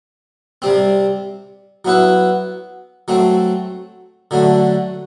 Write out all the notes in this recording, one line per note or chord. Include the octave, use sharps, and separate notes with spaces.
C3 G3 C4
F#3 B3 E4 B4
F#3 A3 C4
D3 F#3 A3